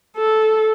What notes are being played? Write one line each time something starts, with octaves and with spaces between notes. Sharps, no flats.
A4